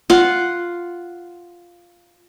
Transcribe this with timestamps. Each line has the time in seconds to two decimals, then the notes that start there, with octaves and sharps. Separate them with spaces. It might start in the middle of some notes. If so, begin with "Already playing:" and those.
0.10 F4 F#5